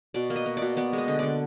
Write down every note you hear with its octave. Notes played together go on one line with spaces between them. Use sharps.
B2 D5
A#3
D#5
A#3
D5
B2
B3 D5
G#3
D#5
D3
D3 D5